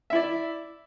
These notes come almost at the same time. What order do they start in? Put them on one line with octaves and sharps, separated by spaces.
E5 E4 D5